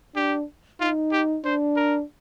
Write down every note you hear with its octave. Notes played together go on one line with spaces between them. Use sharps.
D4 G4
D#4 F4
G4
D4 C5
A#4